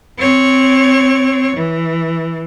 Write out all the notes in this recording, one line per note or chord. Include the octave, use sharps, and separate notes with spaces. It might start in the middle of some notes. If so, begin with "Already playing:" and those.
C4 C#5
E3